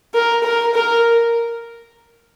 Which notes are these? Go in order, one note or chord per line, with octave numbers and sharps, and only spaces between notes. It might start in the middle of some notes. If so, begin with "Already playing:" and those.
A#4
A#4
A#4